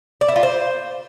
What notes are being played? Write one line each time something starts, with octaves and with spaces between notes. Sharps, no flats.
D5
E4
F4
C5